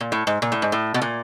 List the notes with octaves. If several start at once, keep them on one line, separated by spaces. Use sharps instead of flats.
A#2
A2
G#2
A#2
A2
G#2
A2
B2
A#2